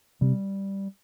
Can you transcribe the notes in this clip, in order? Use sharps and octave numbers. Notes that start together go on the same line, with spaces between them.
C3 G3